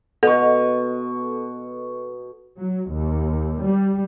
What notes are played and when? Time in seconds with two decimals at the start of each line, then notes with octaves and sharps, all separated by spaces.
0.23 B2 A4 C#6
2.58 F#3
2.90 D#2
3.63 G3